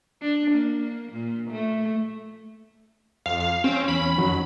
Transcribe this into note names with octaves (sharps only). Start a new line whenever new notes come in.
D4
A#3
A#2
A3
F2 F5
F5
C4 C#4
E2 B5
F2 D#3 F#3